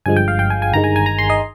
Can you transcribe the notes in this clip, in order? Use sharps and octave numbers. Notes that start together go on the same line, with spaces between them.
G1 G2 F3 G#3 G#5
G5
F5
G5
G#5
G#5
G1 G2 D#3 G#3 A#5
G#5
G#5
A#5
C6
D#5